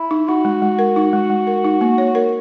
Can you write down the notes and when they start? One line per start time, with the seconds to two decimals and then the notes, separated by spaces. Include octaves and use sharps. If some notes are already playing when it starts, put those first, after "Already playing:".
Already playing: E4
0.11 D#4
0.28 D#4 F#4
0.45 G#3
0.62 G#3
0.79 A#4
0.96 D#4
1.13 G#3
1.30 G#3
1.47 A#4
1.64 D#4
1.81 A#3
1.98 C#5
2.15 A#4